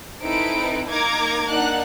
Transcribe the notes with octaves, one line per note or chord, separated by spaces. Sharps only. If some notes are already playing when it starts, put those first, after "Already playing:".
C4 D#4 E4 A4 B4 D7
A#3 D#4 A#5 D6 G#6
A#3 D4 D#4 F#5 F#6